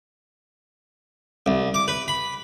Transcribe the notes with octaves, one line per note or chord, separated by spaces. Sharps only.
C2
D6
B4
B5